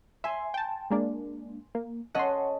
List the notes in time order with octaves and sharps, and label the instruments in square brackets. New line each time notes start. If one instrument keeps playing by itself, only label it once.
[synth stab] E5 [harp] G#5 C6
[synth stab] G5 A5
G#3 A#3 D4
A#3
[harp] C#4 A4 D#5 [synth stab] F#5 C6